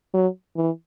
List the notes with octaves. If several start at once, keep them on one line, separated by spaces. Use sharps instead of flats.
F#3
E3